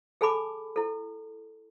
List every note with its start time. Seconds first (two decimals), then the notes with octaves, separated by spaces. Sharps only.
0.21 G#4 A4 G#5 A5 B5 D6
0.76 E4 A4